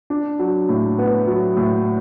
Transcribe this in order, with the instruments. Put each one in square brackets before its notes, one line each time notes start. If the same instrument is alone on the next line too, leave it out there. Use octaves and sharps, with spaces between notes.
[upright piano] D4
F#3
A2
B3
F#3
A2